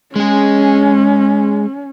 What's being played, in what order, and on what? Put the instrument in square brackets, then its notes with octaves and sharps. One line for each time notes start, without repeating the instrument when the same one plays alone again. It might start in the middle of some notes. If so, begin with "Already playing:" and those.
[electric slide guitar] G#3 G#4 [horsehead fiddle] C#4